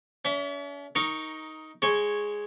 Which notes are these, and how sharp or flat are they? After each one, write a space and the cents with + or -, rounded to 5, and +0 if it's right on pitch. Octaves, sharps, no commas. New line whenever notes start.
C#4 +45 E5 +0
D#4 +10 A#4 +0 C#6 +0
G#3 +0 C#5 -5 C#6 +0